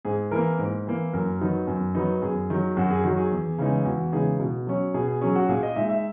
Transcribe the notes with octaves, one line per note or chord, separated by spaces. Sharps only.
G#2 G#4
E3 A#3 A#4
G#2
E3 A#3
F#2 A#4
D#3 F#3 B3 D#4
F#2
D#3 F#3 B3 D#4
F#2 G#4
D#3 F#3
F#2 F#4
G#4
D#3 F#3 F#4
G#4
E2
C#3 E3 G#3 D#4
E2 F#4
C#3 E3 G#3 D#4 G#4
B2
F#3 C#4
B2 G#4
G#4
F#3 C#4 G#4
F#4
A#2 G#4
D#5
G#3 D#4 E5
E5